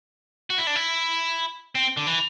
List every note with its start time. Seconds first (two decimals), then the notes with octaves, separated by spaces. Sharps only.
0.50 F#4
0.58 E4
0.67 D4
0.76 E4
1.75 C4
1.97 D3
2.07 E3